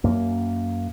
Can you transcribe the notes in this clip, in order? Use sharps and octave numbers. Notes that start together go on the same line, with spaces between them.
F#2 A#3